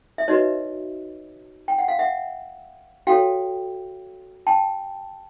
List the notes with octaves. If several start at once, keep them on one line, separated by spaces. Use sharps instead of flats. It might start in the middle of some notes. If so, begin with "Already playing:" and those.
E5
D#4 F#4 B4 C#5 D#5
G5
F#5
F5
E5 F#5
F#4 A4 C#5 F5 G5
G5 A5